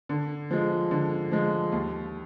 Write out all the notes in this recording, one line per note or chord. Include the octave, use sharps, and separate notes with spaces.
D3
F3 G#3
D3
F3 G#3
D#2